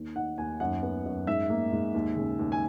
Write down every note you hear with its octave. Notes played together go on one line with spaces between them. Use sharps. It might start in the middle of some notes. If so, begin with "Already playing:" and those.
Already playing: D#2
D#3 F#5
D#2 G#5
F#2 F#5
B3
F#2
G#2 E5
A#3
G#2
D#2
C#3
D#2
G#5